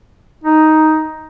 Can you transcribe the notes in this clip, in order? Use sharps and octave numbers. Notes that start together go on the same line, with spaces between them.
D#4